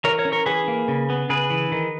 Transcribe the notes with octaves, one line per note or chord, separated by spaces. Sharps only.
E3 A#4 C#5
A#4 C#5
C#4
A#4 C#5
E3 G#4 B4
A#3
C#3
B3
C#3 G#4 B4
E3
D#3